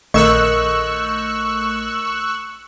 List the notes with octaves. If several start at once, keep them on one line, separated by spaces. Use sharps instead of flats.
A#1 D#3 A3 D#4 C#6 E6 F#6